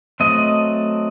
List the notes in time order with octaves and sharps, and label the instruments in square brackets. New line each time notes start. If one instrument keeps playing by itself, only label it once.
[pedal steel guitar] F#3 A3 C4 D#5